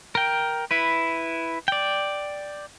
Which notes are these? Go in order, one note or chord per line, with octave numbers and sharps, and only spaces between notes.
A#4 G5
E4 B4
D5 G5